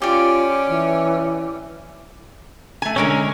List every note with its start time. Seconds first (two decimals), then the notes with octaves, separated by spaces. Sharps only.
0.02 C#4 F4 G4 D5
0.68 E3
2.82 A3 G#5
2.96 D3 G#3 C#4 A#4 C#5